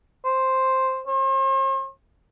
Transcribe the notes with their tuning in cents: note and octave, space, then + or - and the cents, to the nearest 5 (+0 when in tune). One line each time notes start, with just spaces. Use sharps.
C5 +5
C5 +45